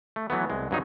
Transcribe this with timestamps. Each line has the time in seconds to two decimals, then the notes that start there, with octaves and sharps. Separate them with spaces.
0.16 A3
0.30 E3 F#3 A3 B3
0.50 C2 G#3
0.71 G2 F#3 D#4